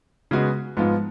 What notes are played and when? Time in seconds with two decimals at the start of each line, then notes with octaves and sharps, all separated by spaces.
0.31 C#3 G#3 B3 F#4
0.77 G#2 F3 B3 F4